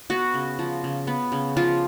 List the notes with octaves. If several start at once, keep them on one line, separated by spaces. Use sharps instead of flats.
B3 F#4
C#3
F3
C#3
B3
C#3
F3 F4